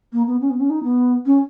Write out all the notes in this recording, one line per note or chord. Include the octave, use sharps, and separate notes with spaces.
A#3
B3
C#4
B3
C#4
D#4
B3
C#4